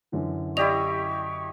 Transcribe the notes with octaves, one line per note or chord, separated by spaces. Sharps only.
F#2 D3 E3
E4 G4 D5 D#5 C#6 F7